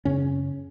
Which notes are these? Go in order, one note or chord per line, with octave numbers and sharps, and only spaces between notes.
F#2 C#3 C#4